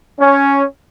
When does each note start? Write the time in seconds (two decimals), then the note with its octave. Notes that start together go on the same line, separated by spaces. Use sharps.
0.20 C#4